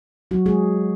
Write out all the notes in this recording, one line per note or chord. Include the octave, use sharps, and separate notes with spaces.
F#3 F#4
G#3 G#4